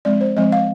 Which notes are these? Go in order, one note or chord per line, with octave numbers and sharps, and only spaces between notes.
F3 G#3 C4 D5
C5
F3 G#3 C4 D#5
F5